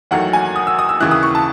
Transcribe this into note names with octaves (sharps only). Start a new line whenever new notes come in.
E2 D#3 F#3 A3 F#5
G#5
D#6
E6
D#6
E6
D#2 C#3 E3 F#6
D#6
C#6
A5